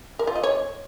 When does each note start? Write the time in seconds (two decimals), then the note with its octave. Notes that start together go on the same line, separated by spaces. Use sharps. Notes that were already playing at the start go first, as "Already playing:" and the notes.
0.19 A#4
0.27 F4
0.35 D#5
0.43 C#5